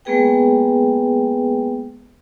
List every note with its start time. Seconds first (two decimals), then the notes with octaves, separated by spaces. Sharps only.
0.05 G#3 A#3 B3 G#4 B4 G5